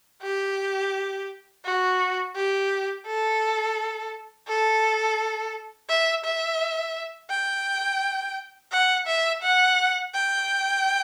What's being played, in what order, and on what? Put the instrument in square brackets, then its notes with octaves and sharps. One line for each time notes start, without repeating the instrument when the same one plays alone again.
[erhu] G4
F#4
G4
A4
A4
E5
E5
G5
F#5
E5
F#5
G5